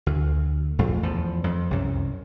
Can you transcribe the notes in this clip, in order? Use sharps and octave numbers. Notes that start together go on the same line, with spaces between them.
D2
A#1 F2 A3
E2 F3
F2
C2 F#2